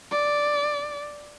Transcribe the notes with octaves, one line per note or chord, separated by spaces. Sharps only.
D5